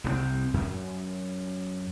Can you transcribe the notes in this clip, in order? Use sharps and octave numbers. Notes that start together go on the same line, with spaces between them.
C2 F#3 C4
F#2